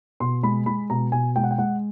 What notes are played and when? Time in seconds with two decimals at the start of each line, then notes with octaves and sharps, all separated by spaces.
0.20 B2 C6
0.43 G#3 B5
0.66 G#3 B5
0.90 B2 A#5
1.12 B2 G#5
1.36 G#3 G5
1.44 F#5
1.51 G5
1.58 G#3 F#5